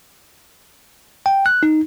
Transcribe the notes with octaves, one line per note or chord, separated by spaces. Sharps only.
G5
F#6
D#4